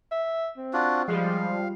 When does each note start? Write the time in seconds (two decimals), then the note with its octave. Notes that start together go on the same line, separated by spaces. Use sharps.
0.11 E5
0.57 C4
0.73 D4 F4 F#4
1.08 F3 G3 G#3 F5